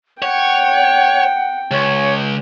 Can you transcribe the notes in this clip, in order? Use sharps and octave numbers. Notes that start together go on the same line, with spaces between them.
C#5 F#5 G5
C#2 C#5